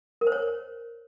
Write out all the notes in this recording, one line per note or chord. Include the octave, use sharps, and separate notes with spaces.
A#4
C5
C#5